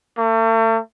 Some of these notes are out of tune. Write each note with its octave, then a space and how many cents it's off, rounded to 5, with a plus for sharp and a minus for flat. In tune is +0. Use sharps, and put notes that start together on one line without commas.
A3 +40